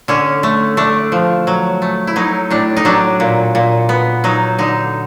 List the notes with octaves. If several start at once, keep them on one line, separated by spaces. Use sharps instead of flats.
D3 C#4
A3
A3 D4
F3
F#3
A3
E4
F#3 D#4
A2 D4
D#4
F#3 D4
A#2
A#2
B3
F#3 D#4
D3 D#4